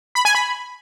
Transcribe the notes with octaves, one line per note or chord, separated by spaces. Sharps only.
B5
G#5
B5